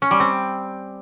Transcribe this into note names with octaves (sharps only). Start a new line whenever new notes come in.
C#4
G3
C4